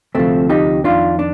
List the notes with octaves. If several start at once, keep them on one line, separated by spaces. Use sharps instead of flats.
D2 C3 F3 A3 C4
D#4 G4
F2 D#3 D4 F4
D4